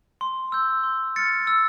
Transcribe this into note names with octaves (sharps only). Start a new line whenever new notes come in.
C6
E6 G6
C6
F6 A6 C#7
E6